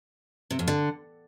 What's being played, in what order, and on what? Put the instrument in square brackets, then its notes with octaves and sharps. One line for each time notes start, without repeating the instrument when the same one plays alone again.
[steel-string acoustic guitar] C3
F2
D3